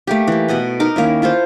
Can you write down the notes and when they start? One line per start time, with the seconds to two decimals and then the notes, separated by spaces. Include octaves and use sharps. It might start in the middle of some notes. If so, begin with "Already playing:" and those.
0.07 A3 A#3 G4
0.27 E3 G4
0.48 B2 A4 D#5 F#5
0.80 D#4 A#4 D6
0.96 D#3 A#3 C#4 E4
1.22 E4 F4 A4 C5